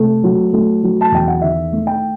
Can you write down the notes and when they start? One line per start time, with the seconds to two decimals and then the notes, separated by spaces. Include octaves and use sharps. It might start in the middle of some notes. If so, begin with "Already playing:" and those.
Already playing: C3 A3
0.23 F#3
0.53 A3
0.83 F#3
1.01 A5
1.12 E2 G5
1.28 F#5
1.41 D#3 E5
1.72 A3
1.87 G5